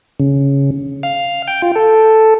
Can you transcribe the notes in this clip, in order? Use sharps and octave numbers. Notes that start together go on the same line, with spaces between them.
C#3
F5
G5
F4
A4